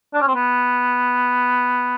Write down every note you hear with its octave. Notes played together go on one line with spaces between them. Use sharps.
D4
C#4
C4
B3